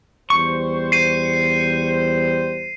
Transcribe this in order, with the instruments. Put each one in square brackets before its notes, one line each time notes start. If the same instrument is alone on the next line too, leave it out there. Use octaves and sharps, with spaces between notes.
[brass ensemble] E2 G3 C5 [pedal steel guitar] C#6
[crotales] C7 D#7